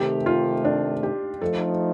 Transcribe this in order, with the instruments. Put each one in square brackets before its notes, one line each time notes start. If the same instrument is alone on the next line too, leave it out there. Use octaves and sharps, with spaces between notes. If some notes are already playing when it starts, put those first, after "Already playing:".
Already playing: [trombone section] C3 D#3 A3 [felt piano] G4
[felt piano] F4
D4
G4
[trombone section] F3 A3 D#4 [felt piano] A4